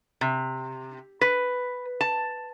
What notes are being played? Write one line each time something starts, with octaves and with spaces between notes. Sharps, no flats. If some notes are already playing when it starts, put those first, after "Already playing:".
C3
B4
A5